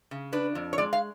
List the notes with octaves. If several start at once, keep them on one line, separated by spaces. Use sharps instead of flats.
C#3
D4 B4
F2
C#5
G#3 D5
F5